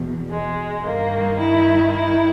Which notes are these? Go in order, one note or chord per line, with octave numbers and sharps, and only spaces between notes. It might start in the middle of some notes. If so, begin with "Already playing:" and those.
Already playing: E2 B2
G#3
G2 D#3 A#3
E4
E4